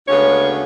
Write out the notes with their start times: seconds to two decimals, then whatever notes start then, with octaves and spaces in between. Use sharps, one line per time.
0.07 D2 C#3 G#3 B3 C#5